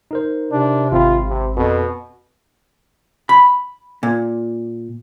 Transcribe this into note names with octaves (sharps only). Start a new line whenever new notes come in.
D#4 A#4 C5
C3 D4
G#1 C4 F4 B5
C3
F2 B2
B5
A#2